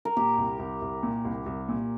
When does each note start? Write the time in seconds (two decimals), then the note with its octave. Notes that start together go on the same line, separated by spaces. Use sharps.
0.05 A#4
0.17 A#2 G4
0.38 C2
0.59 C2
0.82 C2
1.03 A#2
1.25 C2
1.46 C2
1.69 A#2